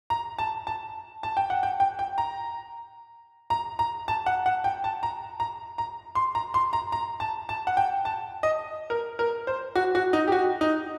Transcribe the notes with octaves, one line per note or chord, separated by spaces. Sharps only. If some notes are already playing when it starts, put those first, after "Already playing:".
A#5
A5
A5
A5
G5
F#5
G5
G5
G5
A#5
A#5
A#5
A5
F#5
F#5
G5
A5
A#5
A#5
A#5
C6
A#5
C6
A#5
A#5
A5
A5
F#5
G5
A5
D#5
A#4
A#4
C5
F#4
F#4
D#4
G4
F#4
D#4